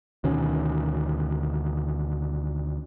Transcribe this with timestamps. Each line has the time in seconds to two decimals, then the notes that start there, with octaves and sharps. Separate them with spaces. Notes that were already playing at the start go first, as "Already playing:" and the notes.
0.24 D2 B2 D#3 C#4